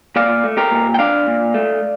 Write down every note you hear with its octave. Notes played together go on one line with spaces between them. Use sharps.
A#2 D5 F5
A3
G4 A#4
A#2
G5
D4 D5 F5
A#2
A3